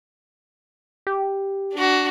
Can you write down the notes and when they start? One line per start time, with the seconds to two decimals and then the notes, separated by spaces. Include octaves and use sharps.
1.07 G4
1.74 D4 F#4